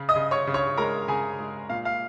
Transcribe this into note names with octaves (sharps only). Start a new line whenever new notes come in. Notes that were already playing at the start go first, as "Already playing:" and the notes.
Already playing: C#3
D#5 D#6
C#3
C#5 C#6
C#3
C#5 C#6
G#3 A#4 A#5
C#3 G#4 G#5
G#3
A#2 F5
F5